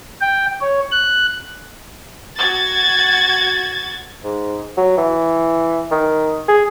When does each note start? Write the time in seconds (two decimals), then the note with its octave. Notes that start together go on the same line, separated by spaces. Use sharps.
0.21 G5
0.61 C#5
0.92 F#6
2.38 F#4 G#6 A6
4.24 G#2
4.77 F#3
4.97 E3
5.91 D#3
6.48 G#4